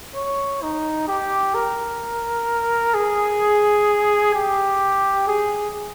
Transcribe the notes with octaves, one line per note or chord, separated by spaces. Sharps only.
C#5
D#4
G4
A#4
G#4
G4
G#4